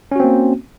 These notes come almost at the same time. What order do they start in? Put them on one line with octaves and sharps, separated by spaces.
C#4 F#4 C4 A#3